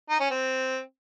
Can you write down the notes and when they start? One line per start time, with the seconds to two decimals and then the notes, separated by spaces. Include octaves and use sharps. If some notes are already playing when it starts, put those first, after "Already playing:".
0.10 D#4
0.20 C#4
0.30 C4